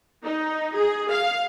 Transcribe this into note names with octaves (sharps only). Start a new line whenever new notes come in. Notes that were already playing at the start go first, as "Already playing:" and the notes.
D#4
G#4
F5